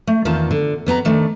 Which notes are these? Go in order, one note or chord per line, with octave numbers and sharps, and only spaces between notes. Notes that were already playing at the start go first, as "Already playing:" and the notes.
A3
E2 D#3 C4 F4 A5
D3
F2 B3 G#5 A#5
D#3 A3 D4